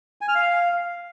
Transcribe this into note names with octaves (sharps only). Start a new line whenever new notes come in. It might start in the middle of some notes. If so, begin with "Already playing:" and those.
G#5
F6
F5